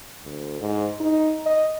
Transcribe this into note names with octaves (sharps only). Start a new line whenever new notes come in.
D2
G#2
D#4
D#5